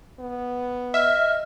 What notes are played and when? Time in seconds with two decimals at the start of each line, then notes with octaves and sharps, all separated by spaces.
0.19 B3
0.94 D#5 E5 F6